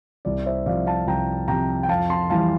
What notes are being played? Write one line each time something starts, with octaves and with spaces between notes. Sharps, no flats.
C2 D5
C5 E5
C3 F3 D5 F5
F5 A5
C2 G5 A#5
C3 F3 G5 A#5
G5
F2 F5 A5
A5 C6
E3 G3 F5 A5